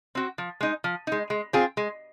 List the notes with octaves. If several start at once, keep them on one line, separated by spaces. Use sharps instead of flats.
C4 F#4
F3
G#3 D#4
F3
G#3 D#4
G#3
C4 F4 G#4
G#3